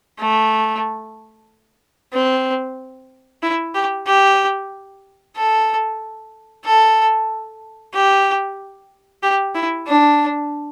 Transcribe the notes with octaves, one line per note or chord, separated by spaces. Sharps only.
A3
C4
E4
G4
G4
A4
A4
G4
G4
E4
D4